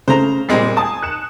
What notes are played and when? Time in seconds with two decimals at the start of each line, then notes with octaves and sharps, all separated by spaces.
0.08 C#3 A3 C5 A#5
0.49 A#2 G3 G#3 C4 C7
0.77 G#5 A5 D#6
1.02 F#6 C#7 E7